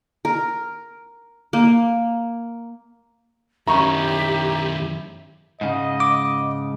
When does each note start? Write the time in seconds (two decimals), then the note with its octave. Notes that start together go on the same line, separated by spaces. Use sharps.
0.25 A#4
1.53 A#3
3.67 F#2 D#3 C#4 D#4 E4 G4 A#5 C#6
5.61 G#2 C#3 D#5
6.00 D6